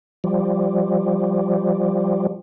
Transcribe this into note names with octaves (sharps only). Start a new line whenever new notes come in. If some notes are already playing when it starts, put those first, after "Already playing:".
F3 G3